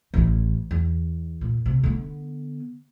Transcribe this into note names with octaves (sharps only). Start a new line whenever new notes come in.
A1 E3
E2
A#2
C3
D3 B3